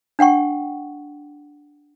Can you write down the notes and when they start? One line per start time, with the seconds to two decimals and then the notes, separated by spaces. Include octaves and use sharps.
0.19 D4 F#5 G5 C#6